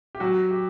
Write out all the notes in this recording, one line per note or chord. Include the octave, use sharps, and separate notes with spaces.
G4
F#3 F#4
G4